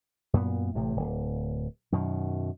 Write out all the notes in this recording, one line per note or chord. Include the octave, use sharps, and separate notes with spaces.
F#2 A#2 B3
A1 A2 C3
D1
F#2 B2 D#3